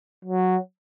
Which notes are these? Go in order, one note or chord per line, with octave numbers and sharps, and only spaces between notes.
F#3